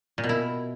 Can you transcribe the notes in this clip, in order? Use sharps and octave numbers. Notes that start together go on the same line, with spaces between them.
A#2
B2
E4